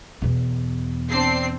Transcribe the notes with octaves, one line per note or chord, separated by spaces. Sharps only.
E2 B2
C4 D4 C7